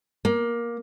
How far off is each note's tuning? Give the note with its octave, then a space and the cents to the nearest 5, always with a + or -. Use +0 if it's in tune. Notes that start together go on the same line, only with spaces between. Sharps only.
A#3 +15